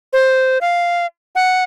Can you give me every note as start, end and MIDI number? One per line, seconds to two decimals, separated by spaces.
0.13 0.58 72
0.61 1.06 77
1.35 1.64 78